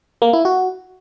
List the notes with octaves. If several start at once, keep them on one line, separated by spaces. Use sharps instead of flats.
A#3
E4
F#4